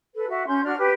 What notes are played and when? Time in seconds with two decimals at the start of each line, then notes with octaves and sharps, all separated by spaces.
0.15 A4 B4
0.29 F#4 E5
0.47 C#4 C6 G6
0.63 D4 F#4 D5 F6
0.78 G4 B4